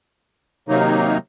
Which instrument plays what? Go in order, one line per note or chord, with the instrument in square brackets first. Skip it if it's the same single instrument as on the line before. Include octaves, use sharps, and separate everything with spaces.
[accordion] C3 D#3 F#3 A#3 D#4